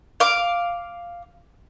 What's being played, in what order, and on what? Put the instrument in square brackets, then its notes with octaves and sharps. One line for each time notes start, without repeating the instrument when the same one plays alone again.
[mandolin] F5 D6